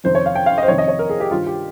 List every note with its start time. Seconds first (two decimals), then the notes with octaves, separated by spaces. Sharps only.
0.04 F2 C3 D#3 C5
0.15 C#5
0.26 F5
0.35 G5
0.46 F5
0.58 D#5
0.63 C5
0.68 F2 C3 D#3 C#5
0.78 D#5
0.88 C#5
0.99 A#4
1.10 G#4
1.20 G4
1.31 G2 D#3 F4
1.47 G4